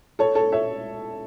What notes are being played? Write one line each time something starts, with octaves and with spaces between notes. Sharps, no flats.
A4 C#5
A4 C#5
C#5 E5